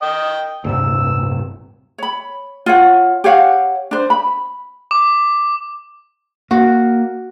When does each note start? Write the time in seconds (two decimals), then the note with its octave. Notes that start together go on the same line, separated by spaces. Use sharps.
0.02 D#5 G5
0.64 D1 G2 C3 E6
1.98 C#5 B5
2.66 F4 C#5 F#5
3.24 G4 C#5 F5 F#5
3.91 D4 C5
4.10 B5
4.91 D6
6.51 A#3 F#4